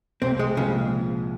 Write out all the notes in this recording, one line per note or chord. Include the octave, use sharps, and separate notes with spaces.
C2 C4
G#3
A#2 C#3 F3 G#3